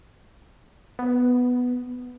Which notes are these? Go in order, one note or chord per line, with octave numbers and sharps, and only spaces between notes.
B3